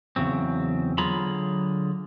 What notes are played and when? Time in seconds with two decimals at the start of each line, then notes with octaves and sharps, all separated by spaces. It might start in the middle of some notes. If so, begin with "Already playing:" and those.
0.16 E2 A2 C#3 F#3 C4
0.98 D3 F#3 F4 G#4 A#5 B5